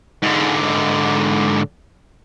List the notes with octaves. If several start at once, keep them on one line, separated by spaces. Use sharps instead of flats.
G#2 D3